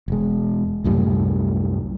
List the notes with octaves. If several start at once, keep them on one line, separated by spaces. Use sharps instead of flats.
E1 G#3
C2 F#2 A2 G3